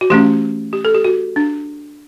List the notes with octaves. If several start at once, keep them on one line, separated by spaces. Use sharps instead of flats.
F#4
E3 A3 C#4 G4
G4
A4
G4
F#4
D4